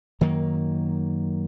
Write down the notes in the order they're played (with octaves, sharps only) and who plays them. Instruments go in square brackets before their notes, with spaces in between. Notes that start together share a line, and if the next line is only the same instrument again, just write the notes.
[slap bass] F#2 D#3 F#3 A#3